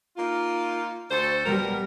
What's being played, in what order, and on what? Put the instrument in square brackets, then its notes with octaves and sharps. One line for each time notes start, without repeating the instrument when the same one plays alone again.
[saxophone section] A#3 D#4 F4
D2 A4 C5
[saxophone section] B2 B3 A#4 [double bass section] G3